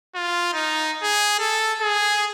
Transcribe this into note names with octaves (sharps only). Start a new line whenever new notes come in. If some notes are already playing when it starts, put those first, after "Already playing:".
F4
D#4
G#4
A4
G#4